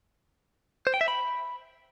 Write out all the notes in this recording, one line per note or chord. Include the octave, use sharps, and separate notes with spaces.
C5
G5
E5
B5